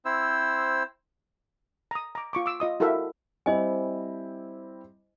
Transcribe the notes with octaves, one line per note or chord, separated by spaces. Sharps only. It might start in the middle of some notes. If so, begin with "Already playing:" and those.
C4 E4 C5 E6
A#5 D#6
A#5 D6
F4 C#6 D6
D6 E6
F4 D#5 D#6
E4 F#4 A4 A#4 E5 F5
G3 C4 E4 C5 D#5 G#5